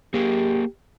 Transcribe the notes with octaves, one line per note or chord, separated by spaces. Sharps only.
A#3 G4 G#4 A#4